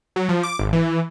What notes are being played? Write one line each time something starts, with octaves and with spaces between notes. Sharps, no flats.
F#3
F3
D6
G#1
E3